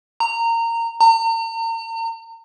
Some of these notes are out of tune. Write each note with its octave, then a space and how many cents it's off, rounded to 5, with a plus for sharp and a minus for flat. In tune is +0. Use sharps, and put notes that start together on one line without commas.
A#5 -20
A#5 -40